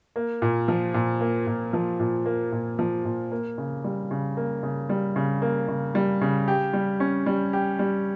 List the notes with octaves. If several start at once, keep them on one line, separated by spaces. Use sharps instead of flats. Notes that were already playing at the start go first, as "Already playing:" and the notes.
A#3
A#2
F3
A#2
A#3
A#2
F3
A#2
A#3
A#2
F3
A#2
A#3
C#3
G3
C#3
A#3
C#3
G3
C#3
A#3
C#3
G3
C#3
G4
G3
C#4
G3
G4
G3